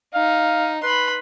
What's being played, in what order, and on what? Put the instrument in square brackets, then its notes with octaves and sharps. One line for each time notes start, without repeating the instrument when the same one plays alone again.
[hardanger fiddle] D#4 [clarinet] F5
[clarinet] B4 [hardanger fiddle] B5 C6